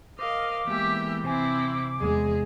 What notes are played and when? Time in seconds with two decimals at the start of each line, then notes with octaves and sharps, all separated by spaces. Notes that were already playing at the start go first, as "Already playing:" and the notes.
0.19 A#4 C5 D#5 F5 D6
0.67 E3 G#3 A#3 B3 G4 E5
1.24 C3 C4 E4 C5 G#5 D6
1.99 E2 G#3 G#4